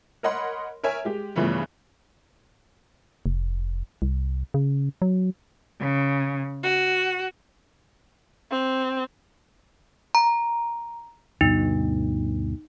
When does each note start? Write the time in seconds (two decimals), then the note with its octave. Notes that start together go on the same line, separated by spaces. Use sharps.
0.23 A#4 C#5 D#5 F#5 B5 C6
0.84 A#4 C#5 E5 G#5
1.05 G#3 G4
1.36 G2 C#3 E3 F3 A3 B3
3.26 F1
4.02 C2
4.54 C#3
5.02 F#3
5.80 C#3
6.63 F#4
8.51 C4
10.15 A#5
11.41 D2 G2 B2 D#4